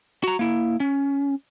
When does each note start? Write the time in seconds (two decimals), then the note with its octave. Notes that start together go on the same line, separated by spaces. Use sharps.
0.24 F#4 A#5
0.39 A#3 E4
0.80 C#4